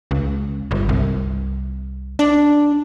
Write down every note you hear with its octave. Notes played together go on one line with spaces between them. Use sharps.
C#2
G1
C2
D4